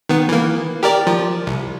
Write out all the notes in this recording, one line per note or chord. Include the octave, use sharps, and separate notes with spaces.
D#3 B3
E3 A#3
G4 A#4 D5
F3
C2